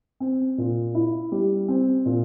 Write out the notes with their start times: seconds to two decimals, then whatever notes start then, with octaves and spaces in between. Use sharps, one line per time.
0.20 C4
0.58 A#2
0.95 E4
1.32 G3
1.68 C4
2.06 A#2